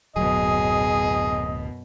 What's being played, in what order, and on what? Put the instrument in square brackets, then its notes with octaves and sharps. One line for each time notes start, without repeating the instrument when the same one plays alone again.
[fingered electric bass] D1 F#3 [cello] F#2 B2 [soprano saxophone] G#4 [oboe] D#5